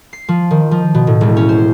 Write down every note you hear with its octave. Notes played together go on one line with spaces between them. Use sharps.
C7
F3
D#3
F3
B2
A2
E1
C#4
C5